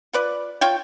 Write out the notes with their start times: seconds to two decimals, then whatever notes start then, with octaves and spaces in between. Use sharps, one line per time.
0.13 F4 B4 D5
0.61 F4 C#5 G5